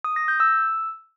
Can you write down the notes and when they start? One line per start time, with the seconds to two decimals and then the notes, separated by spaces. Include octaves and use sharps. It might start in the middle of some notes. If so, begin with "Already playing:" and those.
0.04 D#6
0.16 A#6
0.28 G6
0.40 E6